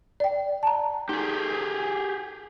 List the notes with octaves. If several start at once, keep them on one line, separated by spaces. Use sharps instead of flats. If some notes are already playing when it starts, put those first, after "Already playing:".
D5 G5
A5 A#5
D#4 G4 G#4